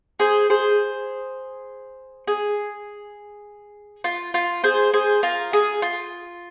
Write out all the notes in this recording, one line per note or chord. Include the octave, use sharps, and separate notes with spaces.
G#4 C5
G#4 C5
G#4
F4
F4
G#4 C5
G#4 C5
F4 A#4
G#4
F4